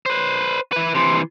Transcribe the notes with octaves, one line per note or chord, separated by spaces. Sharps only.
B4 C5
E4 B4
C3 E3 C6